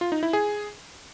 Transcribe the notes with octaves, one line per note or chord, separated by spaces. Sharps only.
F4
D#4
E4
G#4